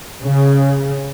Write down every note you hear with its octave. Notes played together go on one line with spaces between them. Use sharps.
C#3